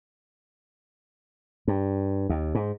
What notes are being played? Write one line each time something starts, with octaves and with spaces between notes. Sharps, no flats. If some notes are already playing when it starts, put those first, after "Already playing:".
G2
D#2
G#2